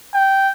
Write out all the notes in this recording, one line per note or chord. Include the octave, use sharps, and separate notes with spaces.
G5